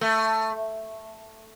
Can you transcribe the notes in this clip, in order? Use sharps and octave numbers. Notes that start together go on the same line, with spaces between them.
A3